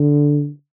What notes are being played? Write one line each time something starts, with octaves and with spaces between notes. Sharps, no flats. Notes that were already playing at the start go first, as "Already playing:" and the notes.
Already playing: D3